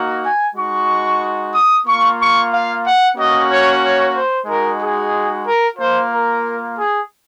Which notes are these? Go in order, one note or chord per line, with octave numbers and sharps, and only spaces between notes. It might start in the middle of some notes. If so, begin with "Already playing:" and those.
Already playing: A#3 D#4 F#4
G#5
G#3 D#4 F#4 C#6
D#6
A#3 F4 C#6
C#6
F5
F#5
A#3 C#4 F#4 D#5
C#5
C#5
C5
G#3 D#4 F#4 A#4
G#4
A#4
A#3 F4 C5
A#4
G#4